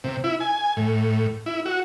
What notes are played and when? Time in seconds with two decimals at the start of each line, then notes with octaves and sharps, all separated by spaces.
0.04 C3
0.24 E4
0.40 G#5
0.77 A2
1.46 E4
1.66 F#4